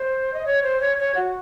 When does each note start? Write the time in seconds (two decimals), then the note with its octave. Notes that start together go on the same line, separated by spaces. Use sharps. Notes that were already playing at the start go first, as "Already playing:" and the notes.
Already playing: C5
0.34 D#5
0.46 C#5
0.63 C5
0.81 C#5
0.98 C#5
1.15 F#4